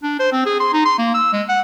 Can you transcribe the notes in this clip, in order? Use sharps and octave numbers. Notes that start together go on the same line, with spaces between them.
D4
C5
C4
G#4
C6
D#4
C6
A#3
E6
G#3
F#5